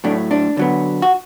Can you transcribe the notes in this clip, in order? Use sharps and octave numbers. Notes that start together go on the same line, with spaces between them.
A2 F#3 A3 D4
D4
D3 F#3 B3
F#4